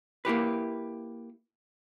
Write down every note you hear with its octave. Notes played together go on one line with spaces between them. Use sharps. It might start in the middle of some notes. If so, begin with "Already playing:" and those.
A#3 E4 G4 B4